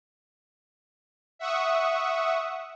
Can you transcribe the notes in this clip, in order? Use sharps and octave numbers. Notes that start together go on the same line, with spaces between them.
E5 F#5 C#6 D#6